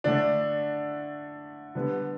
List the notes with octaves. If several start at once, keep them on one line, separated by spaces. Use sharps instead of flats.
D3 A3 D4
D3 G3 B3